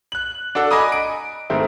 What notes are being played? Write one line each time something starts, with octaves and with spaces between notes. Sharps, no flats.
F#6 F#7
D4 F#4 A4
D#5 G#5 A#5 B5 D6 D#6
D7
G#2 D#3 A3 C4 E4